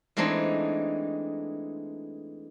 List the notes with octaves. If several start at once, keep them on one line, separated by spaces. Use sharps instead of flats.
E3 G#3 A3 C4 D4 D#4